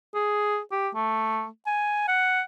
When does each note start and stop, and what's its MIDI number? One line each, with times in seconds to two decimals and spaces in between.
0.15 0.59 68
0.72 0.89 67
0.95 1.47 57
1.67 2.05 80
2.08 2.41 78